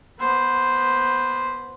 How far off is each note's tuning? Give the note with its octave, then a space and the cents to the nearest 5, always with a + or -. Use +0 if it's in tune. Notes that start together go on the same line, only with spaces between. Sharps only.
B3 -10 C5 +0